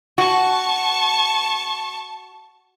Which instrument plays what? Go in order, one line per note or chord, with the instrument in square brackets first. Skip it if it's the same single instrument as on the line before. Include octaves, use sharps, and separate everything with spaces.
[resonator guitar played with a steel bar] F#4 [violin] A5 C#6